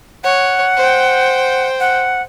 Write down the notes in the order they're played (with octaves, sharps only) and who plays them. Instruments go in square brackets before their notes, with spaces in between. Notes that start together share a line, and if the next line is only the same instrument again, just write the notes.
[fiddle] C#5 [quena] F#5
[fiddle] C5 G5
[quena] F#5